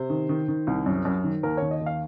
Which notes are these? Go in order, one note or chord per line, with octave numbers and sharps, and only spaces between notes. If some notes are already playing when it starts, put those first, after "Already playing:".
Already playing: C3 C5
D#3
D#3
D#3
C2
F#2
F#2
D#3
D#2 A#4
D#3 C#5
D#5
D#2
F5